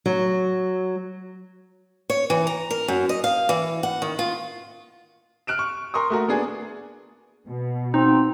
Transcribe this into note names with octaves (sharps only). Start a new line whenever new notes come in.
F#3
C#5
E3
A#5
A#4
F#2
D#5
F5
E3
F#5
D#3
F4
F6 F#6 D7 E7
C#6
A#4 C6 C#6 D#6
A3 F#4 A#4
B3 D4 G#4
B2
C4 D#4